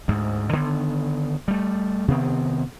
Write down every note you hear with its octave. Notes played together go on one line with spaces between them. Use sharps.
D2 G#2
D3 D#3 B3
G3 A3
C3 D#3 B3 C4